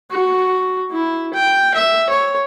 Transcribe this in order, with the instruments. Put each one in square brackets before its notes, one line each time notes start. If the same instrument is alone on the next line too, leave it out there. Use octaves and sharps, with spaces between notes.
[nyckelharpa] F#4
E4
G5
E5
C#5